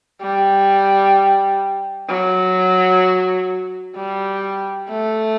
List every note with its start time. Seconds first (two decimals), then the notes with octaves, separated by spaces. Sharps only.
0.21 G3
2.09 F#3
3.95 G3
4.89 A3